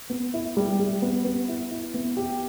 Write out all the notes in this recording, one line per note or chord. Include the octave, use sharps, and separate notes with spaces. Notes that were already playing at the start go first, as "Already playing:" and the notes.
B3
E4
G3
G3
B3
B3
E4
E4
B3
G4